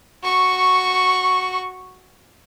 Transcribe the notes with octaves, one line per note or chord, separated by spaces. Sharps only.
F#4 C#6